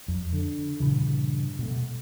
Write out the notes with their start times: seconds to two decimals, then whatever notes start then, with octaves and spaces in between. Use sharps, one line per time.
0.08 F2
0.33 D3
0.80 G2 A#2 C#3 E3
1.59 B2 A3